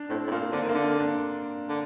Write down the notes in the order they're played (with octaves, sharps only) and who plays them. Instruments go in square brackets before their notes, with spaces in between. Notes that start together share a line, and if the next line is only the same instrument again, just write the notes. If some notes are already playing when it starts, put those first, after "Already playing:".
Already playing: [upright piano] D4
[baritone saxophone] A2 [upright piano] C4
[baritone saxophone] A2
[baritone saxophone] A#2 [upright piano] A#3
[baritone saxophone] D3 [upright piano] C4
[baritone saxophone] D#3
[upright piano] A#3
[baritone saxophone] D3
[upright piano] A#3
D4
[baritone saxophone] D3